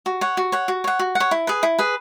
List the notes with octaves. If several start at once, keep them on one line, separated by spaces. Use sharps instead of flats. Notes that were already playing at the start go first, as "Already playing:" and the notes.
F#4
C#5 F#5
F#4
C#5 F#5
F#4
C#5 F#5
F#4
F#5
C#5
E4
G#4 B4
E4
G#4 B4